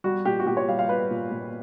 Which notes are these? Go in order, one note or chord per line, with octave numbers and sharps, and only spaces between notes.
G3 F#4
A#2 G4
F#4
A#2 G4
C#5
G3 F5
F5
G3 B4
A#2
A#2